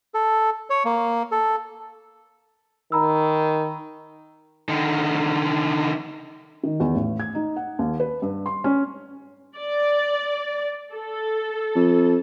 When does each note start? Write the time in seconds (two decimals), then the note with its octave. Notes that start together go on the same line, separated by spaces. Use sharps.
0.14 A4
0.70 C#5
0.85 A#3
1.32 A4
2.92 D#3 A#5 B5 E6
4.69 D3 D#3
6.63 D#3
6.80 E2
6.95 A1
7.20 G#6
7.35 D#4
7.56 F#5
7.79 D#2
8.00 B4
8.22 G2
8.46 C6
8.64 C#4
9.57 D5
10.93 A4
11.76 F2